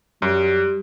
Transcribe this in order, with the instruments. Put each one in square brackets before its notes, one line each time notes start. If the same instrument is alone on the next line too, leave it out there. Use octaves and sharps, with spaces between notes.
[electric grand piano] F#2 [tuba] G3